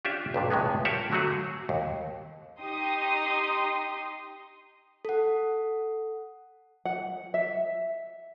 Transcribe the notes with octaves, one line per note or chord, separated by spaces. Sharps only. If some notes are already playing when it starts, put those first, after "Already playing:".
C#4 D4 F4 G4 E5
B1 G2 A#2
C#2 A2 C3 G#3 B3
F4 G4 A#4 C#5 E5 F#5
D3 F#3 A3 F#4 G#4
D#2
D#4 G4 C6 D#6
A4 F#5
F#5
E5